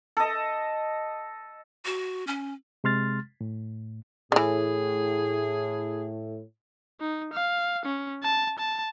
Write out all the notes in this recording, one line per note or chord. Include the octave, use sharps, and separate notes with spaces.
A4 D#5
F#4
C#4
C3 G#3 C6 F6 A6
A2
A2 D3 E3 G#4
D#4
F5
C#4
A5
A5